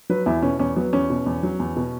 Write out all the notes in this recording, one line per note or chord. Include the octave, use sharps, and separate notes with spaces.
F#3 B4
E2 E4
B2 C#4
E2 C#4
F#3 B3
E2 C#4
B2
E2
F#3
E2
B2